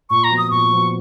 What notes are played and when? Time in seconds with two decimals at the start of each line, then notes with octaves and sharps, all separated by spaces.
0.10 A#2 C#6
0.24 A#5
0.30 F3 B3 F#4
0.38 D#6
0.51 A#2 C#6
0.72 F3 B3 F#4